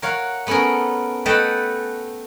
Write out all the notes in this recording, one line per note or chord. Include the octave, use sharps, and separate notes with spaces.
A#4 C#5 F5 F#5
A3 B3 C#4 G#4 A#4
A3 B4 D#5 F#5 G5 A5